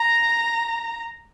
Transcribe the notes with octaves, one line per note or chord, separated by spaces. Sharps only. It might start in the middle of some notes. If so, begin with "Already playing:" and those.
Already playing: A#5